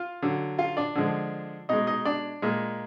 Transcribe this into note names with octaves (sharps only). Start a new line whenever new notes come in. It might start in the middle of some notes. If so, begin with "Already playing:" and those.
Already playing: F4 F5
D3 F#3
F4 F5
D4 D5
D3 F3 G#3
B2 G#3 D#4 D#5
D#4 D#5
D4 D5
A#2 G#3